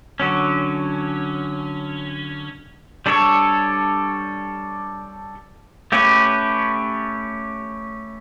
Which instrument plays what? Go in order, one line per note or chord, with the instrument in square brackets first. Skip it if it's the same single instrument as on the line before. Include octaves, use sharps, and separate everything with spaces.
[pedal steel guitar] D3 F#3 C#4
G3 D4 A4 C#5
A3 C#4 G4 B4